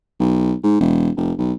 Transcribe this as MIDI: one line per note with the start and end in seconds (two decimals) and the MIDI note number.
0.20 0.54 35
0.64 0.79 44
0.80 1.10 28
1.17 1.33 29
1.38 1.53 35